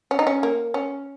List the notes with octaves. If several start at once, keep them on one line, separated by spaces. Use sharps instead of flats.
C#4
D#4
C#4
A#3
C#4